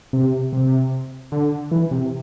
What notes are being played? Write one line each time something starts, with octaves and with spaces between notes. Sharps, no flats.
C3
C3
D3
E3
C3